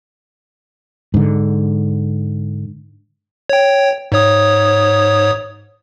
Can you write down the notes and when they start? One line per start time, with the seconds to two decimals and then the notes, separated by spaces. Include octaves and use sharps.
1.14 G#2 D3
3.49 C#5 G5
4.12 G#2 C#5 D#6